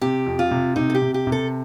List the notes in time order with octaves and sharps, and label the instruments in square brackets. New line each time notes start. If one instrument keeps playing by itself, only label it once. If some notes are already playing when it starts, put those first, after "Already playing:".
[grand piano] C3 [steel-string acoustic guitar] G4
[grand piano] F2
[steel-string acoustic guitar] F4
[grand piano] C3
[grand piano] C3 [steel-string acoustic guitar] D#4
[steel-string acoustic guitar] A4
G4
[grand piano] C3
[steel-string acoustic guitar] G4
[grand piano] C3
[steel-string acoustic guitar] A4